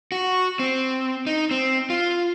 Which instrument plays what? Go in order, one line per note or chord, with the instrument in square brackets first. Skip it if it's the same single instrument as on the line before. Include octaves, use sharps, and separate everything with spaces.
[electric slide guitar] F#4
C4
D#4
C4
F4